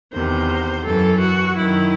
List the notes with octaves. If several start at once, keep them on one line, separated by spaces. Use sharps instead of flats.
E2 C3 D#3 C5
F#2 E3 A4
F#4
F#2 D#3 E4